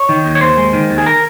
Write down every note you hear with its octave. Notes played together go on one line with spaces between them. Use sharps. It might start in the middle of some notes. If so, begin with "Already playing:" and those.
Already playing: C#5
D#3
D#2
C#5
D#2 C5
G#3
D#3
D#2
G#4
A#4